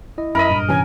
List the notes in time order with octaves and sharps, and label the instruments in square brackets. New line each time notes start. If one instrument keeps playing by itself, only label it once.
[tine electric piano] E4 D#5
[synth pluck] F#2 [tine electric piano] E4 E5 [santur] A#4 D#5 [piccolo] B5
[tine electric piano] G2 A#2
[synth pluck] C3 E3 C#4 [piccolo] G#5